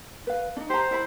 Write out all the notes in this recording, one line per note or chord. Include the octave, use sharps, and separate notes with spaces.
B4 F5
D4 D#4
G4 C5 A#5
E4 E5 B5